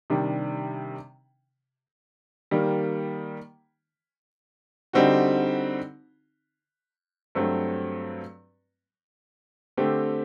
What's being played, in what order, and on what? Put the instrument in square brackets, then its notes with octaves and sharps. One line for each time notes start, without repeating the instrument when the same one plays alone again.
[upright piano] C3 D#3 G3 D4
D#3 G3 A#3
D3 G3 C4 D#4 F#4
G2 F#3 A3 C4
D3 A3 C4 G4